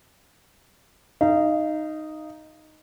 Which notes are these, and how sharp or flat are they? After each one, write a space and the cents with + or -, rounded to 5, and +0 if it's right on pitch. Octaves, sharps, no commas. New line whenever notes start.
D#4 -5 F5 -30